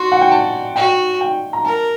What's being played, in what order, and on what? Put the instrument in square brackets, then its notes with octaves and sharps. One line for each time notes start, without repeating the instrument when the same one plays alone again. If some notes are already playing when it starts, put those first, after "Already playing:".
Already playing: [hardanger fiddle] F#4 [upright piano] C6
[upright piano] F#5
G5
A5
[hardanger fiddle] F#4 [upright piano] G5
[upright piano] G5
A#5
[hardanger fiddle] A#4 [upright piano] A5